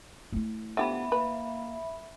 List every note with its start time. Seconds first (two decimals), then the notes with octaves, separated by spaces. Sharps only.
0.32 A3 E4
0.77 D3 F3 B3 G4 E5 B5
1.12 A#3 B4